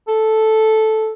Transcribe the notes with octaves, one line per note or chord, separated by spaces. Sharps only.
A4